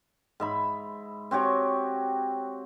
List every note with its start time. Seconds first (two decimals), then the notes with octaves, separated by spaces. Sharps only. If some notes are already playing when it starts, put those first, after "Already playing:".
0.40 G#2 E5 B5
1.31 C4 F#4 G4 C#5